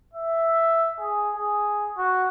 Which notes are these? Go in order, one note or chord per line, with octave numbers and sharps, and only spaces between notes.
E5
G#4
G#4
F#4